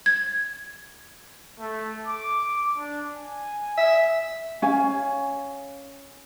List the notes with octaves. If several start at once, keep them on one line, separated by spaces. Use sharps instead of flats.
G#6
A3
D6
D4
G#5
E5
C#4 F5 G#5